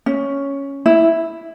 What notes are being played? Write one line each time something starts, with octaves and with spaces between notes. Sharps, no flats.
C#4
E4